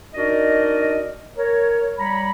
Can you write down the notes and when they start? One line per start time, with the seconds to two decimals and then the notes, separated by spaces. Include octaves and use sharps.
0.15 D4 D#4 F#4 A#4 D5 D#5
1.36 A#4 C#5
1.98 G3 C#5 A#5 B5